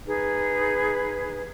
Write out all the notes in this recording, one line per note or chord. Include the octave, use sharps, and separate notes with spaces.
D#4 G#4 B4